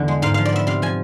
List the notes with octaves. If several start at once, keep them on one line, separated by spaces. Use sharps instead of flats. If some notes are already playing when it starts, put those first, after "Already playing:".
Already playing: E2 D3
G#3
G#2 F5
F3 F5
D5
B3 E5
C3 F5
F3 G#5